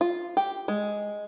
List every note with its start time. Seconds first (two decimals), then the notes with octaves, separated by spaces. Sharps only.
0.01 F4
0.37 G4
0.68 G#3